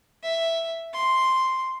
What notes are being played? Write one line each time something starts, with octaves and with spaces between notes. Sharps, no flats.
E5
C6